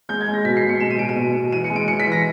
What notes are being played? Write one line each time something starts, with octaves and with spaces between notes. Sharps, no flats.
G#3 G6
G#6
G#3
A#6
B2 B6
C7
B2
C#7
G#3 E7
D#7
B2 D7
D#7
B2
B2
E3 D#7
C#7
G#3
D7
E3 C#7
B6
E3
A#6